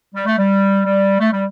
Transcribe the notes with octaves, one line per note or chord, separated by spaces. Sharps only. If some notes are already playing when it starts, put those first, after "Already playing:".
G3
A3
G3
G3
A3
G3